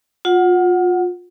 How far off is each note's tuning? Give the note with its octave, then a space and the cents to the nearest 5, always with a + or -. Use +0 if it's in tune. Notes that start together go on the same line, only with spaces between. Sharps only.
F4 +25 F#5 +0